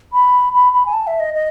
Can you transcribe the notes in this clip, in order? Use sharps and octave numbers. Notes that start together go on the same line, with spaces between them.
B5
B5
B5
G#5
A5
E5
D#5
D#5